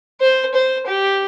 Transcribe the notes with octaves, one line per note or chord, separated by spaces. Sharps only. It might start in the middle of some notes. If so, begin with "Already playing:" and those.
C5
C5
G4